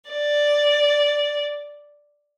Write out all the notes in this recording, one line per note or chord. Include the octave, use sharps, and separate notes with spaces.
D5